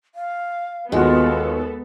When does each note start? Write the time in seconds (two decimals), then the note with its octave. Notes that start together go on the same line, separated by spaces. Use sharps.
0.15 F5
0.92 D#2 G#3 B3 F4 F#4 A4